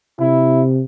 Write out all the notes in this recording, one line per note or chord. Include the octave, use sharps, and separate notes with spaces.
C3 E4